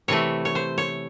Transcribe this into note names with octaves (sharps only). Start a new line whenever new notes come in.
C3 E3 A3 C#5
C#5
C5
C#5